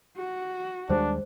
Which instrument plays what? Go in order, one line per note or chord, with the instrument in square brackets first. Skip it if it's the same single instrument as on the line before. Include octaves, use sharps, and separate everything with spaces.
[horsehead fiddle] F#4
[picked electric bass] D#2 G3 G#3 [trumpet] D4 [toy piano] C5